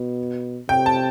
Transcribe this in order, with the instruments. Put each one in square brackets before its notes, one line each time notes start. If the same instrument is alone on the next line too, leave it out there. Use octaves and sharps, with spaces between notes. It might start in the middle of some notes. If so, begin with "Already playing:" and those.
Already playing: [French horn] B2
[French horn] C3 [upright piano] G5
[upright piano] A5